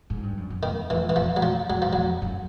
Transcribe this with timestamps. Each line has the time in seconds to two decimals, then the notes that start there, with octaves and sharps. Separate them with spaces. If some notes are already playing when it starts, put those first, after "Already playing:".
0.10 G#2
0.23 G2
0.37 F#2
0.50 F#2
0.63 E2 D#3
0.90 F2 E3
1.09 E3
1.16 F2 F3
1.36 F#3
1.42 F3
1.69 F2 F#3
1.82 F3
1.93 F2 F#3
2.22 F#2